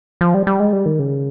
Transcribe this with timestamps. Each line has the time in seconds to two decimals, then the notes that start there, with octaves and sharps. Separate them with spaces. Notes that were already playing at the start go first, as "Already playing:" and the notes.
0.21 F3
0.34 G3
0.47 G3
0.60 G#3
0.73 G3
0.86 D#3
0.99 C#3